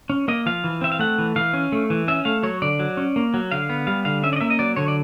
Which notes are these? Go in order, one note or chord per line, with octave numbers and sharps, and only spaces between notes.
C#4
A#3 D#5
F3 F5
E3
C4 E5
F5
A3 F#5
E3
E3 F5
C#4
A3
E3
C#4 E5
A3 F5
F#3 C#5
D3 D5
F#3
C#4
A#3
F#3
D3 F5
B3
G3 F5
D3 F5
C#4 E5
D5
D#5
A#3 E5
D#5
F#3 D5
D3 C#5
D5